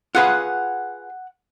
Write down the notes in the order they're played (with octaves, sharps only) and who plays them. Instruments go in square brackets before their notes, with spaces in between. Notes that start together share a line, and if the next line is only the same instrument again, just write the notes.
[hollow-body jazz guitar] F4 G#4 B4 [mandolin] F#5